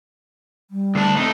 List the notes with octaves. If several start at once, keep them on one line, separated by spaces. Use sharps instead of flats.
G3
D2 D4
A3 C4 D#4